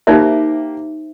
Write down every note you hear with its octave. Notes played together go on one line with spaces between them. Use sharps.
A#3 D#4 G4 C5 E5